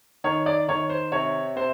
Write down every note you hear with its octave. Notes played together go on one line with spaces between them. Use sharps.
D#3 C#5
D5
D#3 C#5
C5
C3 C#5
C3 C5